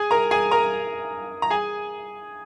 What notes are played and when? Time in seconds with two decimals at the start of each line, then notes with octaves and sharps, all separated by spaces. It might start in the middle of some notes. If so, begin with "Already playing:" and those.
Already playing: G#4 G#5
0.11 A#4 A#5
0.31 G#4 G#5
0.51 A#4 A#5
1.42 A#5
1.50 G#4 G#5